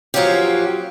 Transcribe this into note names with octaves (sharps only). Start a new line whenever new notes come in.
F3 F#3 A#3 C#4 F4 G4